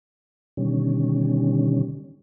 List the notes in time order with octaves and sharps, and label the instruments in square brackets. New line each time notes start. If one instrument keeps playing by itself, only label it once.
[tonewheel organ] B2 D3 D#3 G3 C#4